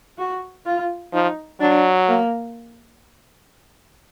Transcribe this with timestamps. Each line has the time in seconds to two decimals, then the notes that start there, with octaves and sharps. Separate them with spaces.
0.18 F#4
0.66 F4
1.13 F3 D#4
1.60 F#3 D4
2.08 A#3